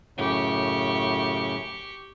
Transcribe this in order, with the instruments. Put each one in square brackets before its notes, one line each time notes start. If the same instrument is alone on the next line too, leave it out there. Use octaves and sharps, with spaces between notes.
[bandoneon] F#2 A2 C#3 [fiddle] G4 C#6